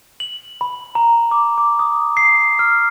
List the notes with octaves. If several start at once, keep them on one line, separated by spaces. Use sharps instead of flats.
F#7
B5
A#5
D6
D6
D#6
C7
F6